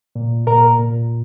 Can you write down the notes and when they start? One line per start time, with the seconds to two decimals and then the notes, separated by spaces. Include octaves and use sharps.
0.16 A#2
0.47 A#2 A#4 A#5
0.79 A#2